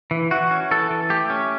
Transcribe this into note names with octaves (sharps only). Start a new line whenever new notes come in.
E3
E3 F#4
C#4
E3 A4
E3
A3 G4
C#4